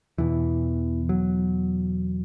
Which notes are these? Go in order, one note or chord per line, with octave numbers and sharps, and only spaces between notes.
E2 B2 E3
F#3